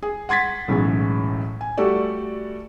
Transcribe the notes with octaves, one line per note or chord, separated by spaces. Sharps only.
G#4
F#5 C6 G#6 A6 B6
B1 A2 C#3 E3 F#3 G#3
G#5
G3 A3 F#4 G4 A4 D5